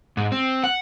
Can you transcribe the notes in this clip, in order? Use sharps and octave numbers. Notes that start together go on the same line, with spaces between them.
G#2
C4
F#5